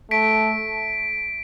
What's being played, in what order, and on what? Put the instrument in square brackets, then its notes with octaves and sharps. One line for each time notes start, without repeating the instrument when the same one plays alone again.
[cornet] A3 [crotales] B6 D7